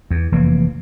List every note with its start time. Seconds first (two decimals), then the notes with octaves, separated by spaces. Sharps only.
0.11 E2
0.32 F1 E3 A#3